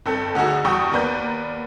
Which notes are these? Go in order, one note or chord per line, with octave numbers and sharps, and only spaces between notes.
G1 C4 A4
D2 D3 D#4 F#4 G#4
E2 G2 F#4 G5 C#6 D#6
D#2 B3 A#4 B4 D5 G6